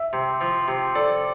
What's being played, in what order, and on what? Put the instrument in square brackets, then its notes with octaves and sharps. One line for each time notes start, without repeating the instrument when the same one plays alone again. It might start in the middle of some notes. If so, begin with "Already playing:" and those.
Already playing: [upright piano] E5
[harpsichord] C3
F3
C3
[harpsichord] A4 [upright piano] D5